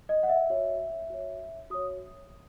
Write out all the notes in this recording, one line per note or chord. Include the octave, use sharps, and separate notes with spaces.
D#5
F#5
E5
F#4 C#5
F#4 C#5
F#4 C#5 D#6